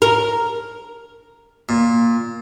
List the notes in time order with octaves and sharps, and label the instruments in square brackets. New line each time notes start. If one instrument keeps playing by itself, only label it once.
[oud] A#4
[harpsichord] A#2